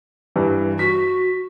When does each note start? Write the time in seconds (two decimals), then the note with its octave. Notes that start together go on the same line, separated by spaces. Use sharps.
0.36 G2 E3
0.79 F#4 B6